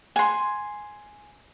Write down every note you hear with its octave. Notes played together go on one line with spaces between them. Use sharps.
G#5 C6